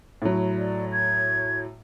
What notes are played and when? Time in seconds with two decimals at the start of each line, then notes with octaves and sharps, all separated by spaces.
0.22 A2 F#3
0.58 D5
0.92 G#6